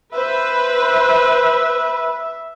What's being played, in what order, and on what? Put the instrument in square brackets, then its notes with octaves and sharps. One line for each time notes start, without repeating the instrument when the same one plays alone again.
[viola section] B4 [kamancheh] C5 [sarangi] E5